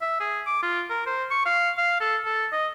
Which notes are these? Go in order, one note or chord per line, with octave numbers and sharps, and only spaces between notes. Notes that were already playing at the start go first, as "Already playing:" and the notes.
E5
G#4
D6
F4
A#4
C5
C#6
F5
F5
A4
A4
D#5